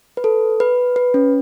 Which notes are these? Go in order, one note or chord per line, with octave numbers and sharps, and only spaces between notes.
B4
A4
B4
B4
C#4